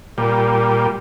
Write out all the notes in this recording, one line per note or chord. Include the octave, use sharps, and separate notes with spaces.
A#2 G3